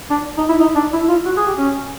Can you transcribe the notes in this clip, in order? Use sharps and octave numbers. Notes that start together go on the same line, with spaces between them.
D4
D#4
E4
D#4
D4
E4
F4
F#4
G#4
G4
C#4